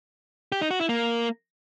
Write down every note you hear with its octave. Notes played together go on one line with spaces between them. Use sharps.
G4
D#4
F#4
E4
A#3